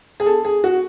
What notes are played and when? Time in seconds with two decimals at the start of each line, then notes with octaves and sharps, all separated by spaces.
0.20 G#4
0.26 A4
0.45 G#4
0.64 F#4